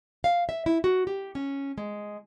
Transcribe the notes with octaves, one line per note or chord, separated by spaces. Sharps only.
F5
E5
E4
F#4
G4
C#4
G#3